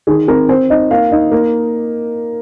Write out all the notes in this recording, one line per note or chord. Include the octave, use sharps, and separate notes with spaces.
D#3 G#4
C4 A#4
C4 C5
D#4 D#5
A#3 F5
D#4
A#3